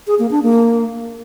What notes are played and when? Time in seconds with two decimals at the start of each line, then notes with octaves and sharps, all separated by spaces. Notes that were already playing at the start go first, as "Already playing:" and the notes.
0.07 G#4
0.19 A#3
0.31 D4
0.43 A#3